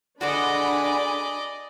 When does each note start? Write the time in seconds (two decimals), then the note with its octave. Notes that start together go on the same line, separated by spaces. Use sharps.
0.21 D3 G#3 D4 F#4 D5 D#5 G#5 B5